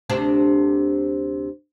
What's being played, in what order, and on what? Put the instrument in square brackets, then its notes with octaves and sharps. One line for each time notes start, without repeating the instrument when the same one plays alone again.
[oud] D2 C3 D4